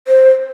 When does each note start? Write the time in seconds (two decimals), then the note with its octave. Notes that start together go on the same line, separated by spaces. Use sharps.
0.08 C5